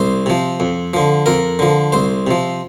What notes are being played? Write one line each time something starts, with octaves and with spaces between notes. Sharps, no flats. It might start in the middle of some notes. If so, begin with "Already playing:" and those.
Already playing: C2 C5
C3 F3
F2
D3 F3
F2 A#4
D3 F3
C2 C5
C3 F3